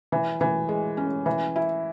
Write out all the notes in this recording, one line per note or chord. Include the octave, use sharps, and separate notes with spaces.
E3
E3
G#3
C#4
E3
E4